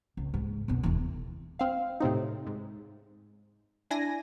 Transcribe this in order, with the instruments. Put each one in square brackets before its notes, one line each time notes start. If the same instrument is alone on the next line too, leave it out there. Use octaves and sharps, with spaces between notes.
[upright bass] C#2
G#2
F#2 B2
E1 E3
[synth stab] C4 F5
A2 C3 C4 D#4
G#2
D4 E4 G#5 A#6